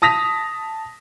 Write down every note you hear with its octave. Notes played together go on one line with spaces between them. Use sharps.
A5 D#6 A#6 B6 F7